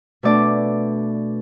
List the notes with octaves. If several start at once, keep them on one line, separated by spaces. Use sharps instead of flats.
B2 A3 D4 D5